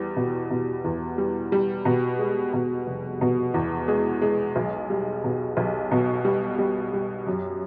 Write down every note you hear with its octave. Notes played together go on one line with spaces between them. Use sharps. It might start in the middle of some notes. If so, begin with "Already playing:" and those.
Already playing: E2 G3
B2
B2
E2
G3
G3
B2
G#3
B2
F1
B2
E2
G#3
G#3
B1
G3
B2
B1
B2
G3
G3
G3
F#2